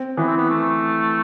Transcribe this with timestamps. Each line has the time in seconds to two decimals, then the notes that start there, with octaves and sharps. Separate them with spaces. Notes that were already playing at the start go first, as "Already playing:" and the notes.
Already playing: C4
0.17 E3 B3
0.27 C4
0.37 B3
0.50 A3